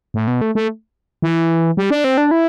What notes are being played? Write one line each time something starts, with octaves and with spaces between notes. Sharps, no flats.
A2
B2
A3
A3
E3
G3
D4
C4
D4
E4